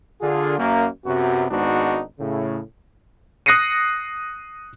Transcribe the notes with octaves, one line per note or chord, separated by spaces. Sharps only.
D3 F4 G#4
F#2 A#3
F#2 C3 F#3 B3 F#4
G#1 G#2 B3 D4 D#4 F#4
A2 C#3
D#6 F#6 A#6 C7 C#7 D#7